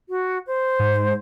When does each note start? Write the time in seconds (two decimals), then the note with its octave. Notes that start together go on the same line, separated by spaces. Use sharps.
0.09 F#4
0.47 C5
0.79 G#2